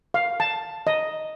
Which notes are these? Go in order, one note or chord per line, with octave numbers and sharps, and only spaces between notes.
F5
A5
D#5